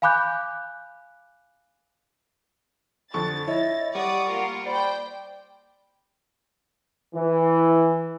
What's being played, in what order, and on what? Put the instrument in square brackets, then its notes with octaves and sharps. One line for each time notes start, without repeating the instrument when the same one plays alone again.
[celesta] F5 G#5 B5 D6 F#6 G6
[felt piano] F2 D3 C#6 [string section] A6
[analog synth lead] E4 [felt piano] C#5 [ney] D#5
[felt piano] G3 [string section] D5 D#6 [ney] F#5 [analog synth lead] C#6
[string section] A#3 F4 A#4
[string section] C5 G5 [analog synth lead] D5 [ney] B5
[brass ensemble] E3